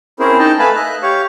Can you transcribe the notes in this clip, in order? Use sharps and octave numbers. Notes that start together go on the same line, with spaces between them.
C4 C#4 E4 G#4 A#4 C5
D#4 D#5 G5 A5
A3 B4 F5 G#5 A5 B5
D#5 E5 F#6
G4 C#5 F5 C#6